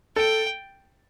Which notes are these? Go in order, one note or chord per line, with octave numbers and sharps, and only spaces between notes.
A4 G5